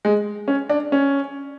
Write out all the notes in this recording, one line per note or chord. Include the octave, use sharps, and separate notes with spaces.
G#3
C#4
D4
C#4